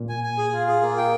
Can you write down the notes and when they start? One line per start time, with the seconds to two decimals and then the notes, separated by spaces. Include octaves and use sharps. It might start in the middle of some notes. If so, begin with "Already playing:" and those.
Already playing: A#2
0.09 G#5
0.24 G#5
0.38 G#4
0.53 F4
0.67 G#4
0.82 A#3
0.97 G5